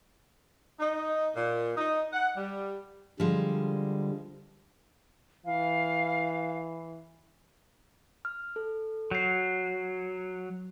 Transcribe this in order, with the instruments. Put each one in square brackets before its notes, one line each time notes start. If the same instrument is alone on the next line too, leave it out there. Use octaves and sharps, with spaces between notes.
[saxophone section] D#4
A#2
D#4
F#5
G3
[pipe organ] D3 G3 [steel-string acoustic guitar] F3 G#3
[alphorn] E3 [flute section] F5
[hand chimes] F6
A4
[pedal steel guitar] F#3 [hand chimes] G6 C7